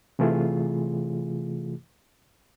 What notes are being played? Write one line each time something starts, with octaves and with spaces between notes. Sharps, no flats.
C3 E3 A3 F4 G#4